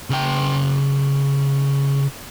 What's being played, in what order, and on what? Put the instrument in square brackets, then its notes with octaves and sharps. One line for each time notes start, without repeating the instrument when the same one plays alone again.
[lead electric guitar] C#3 G5